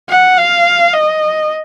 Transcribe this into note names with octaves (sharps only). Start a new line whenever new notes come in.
F#5
F5
D#5